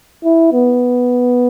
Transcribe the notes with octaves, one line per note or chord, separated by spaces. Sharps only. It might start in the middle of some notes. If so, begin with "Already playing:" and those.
E4
B3